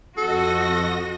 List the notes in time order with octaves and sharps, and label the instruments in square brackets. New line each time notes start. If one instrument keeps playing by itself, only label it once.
[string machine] F2 D#5 A#6 [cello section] F#4 [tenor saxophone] A4